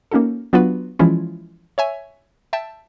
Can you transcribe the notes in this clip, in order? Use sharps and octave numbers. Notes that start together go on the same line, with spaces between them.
A#3 C#4 D#4 F#4 A4
F#3 B3 D4 F4 F#4 B4
E3 F3 G#3 C#4 E4 F4
C#5 E5 G#5
E5 G5 A5